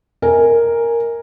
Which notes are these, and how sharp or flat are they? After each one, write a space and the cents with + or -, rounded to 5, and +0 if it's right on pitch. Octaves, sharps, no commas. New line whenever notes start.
A#4 +0 D#5 +25 G#5 -5